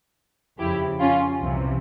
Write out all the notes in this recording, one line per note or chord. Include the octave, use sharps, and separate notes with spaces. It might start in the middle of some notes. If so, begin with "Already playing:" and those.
F2 C#3 F3 E4 G4
C#4 F4
C2 C3 E3